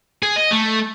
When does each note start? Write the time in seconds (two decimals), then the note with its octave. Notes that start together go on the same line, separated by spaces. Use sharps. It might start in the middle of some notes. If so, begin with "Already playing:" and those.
0.23 G#4
0.36 D#5
0.51 A3